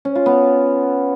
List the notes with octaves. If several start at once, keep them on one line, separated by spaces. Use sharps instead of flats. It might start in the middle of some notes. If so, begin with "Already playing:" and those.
C#4
F4
B3